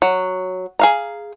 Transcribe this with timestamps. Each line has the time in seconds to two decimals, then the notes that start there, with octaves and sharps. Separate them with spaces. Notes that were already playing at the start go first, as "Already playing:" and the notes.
0.02 F#3
0.79 G#4 F5 A#5